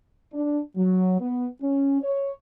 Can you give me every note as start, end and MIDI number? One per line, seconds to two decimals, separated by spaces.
0.33 0.59 62
0.76 1.17 54
1.20 1.46 59
1.61 2.01 61
2.01 2.31 73